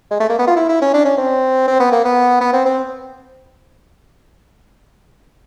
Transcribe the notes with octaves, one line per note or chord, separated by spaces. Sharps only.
G#3
A3
A#3
B3
F4
E4
E4
C#4
D4
C#4
C4
C4
B3
A#3
B3
B3
C4
C4